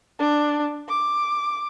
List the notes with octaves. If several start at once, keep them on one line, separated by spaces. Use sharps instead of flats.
D4
D6